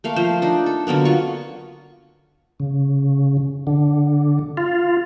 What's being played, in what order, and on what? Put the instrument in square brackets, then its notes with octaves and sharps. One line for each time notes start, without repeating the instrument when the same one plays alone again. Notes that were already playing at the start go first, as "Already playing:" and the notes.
[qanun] A3 A#3 F5
F3 C5
D4 D#4
A4
D3 F#3 A#3 B3
C#4 F4 C#6
[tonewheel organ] C#3
D3
F4